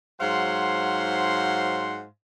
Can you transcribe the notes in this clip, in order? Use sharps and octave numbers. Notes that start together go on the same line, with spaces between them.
G#2 F#3 C5 F5 F#5 C6